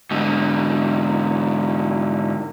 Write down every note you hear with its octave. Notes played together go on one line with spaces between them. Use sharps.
G#2 D3